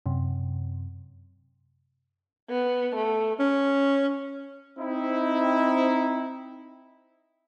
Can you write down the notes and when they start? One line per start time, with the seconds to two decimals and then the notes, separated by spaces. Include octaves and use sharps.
0.06 F#2 C3
2.49 B3
2.95 A3
3.40 C#4
4.79 C4 D#4 E4